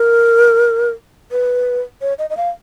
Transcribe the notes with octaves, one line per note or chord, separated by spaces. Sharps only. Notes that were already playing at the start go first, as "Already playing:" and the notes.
Already playing: A#4
B4
C#5
D#5
D#5
F5